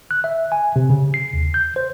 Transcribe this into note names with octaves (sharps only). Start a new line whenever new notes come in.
F#6
E5
G#5
C3
C#3
C7
D#2
G6
C5